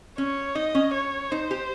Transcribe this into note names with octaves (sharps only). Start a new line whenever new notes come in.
C#4 C#5
D#4 D#5
C#4
C#5
D#4 C5
G4